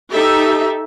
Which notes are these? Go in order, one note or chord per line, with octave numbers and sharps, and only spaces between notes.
D#4 G4 A4 E5